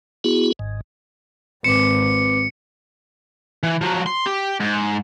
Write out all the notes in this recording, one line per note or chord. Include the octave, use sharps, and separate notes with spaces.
B3 E4 F#4 G#4
G#1 G#2
G#1 C4 B4 D6 C#7
E3
F3 F#3
C6
G4
G#2